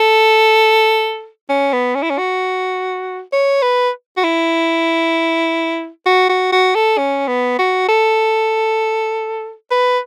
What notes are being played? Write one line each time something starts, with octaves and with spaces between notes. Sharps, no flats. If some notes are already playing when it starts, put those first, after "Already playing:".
Already playing: A4
C#4
B3
C#4
E4
C#4
F#4
C#5
B4
F#4
E4
F#4
F#4
F#4
A4
C#4
B3
F#4
A4
B4